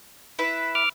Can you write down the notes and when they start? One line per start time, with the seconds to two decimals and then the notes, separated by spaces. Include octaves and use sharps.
0.39 E4 B4 E5
0.75 D6 F6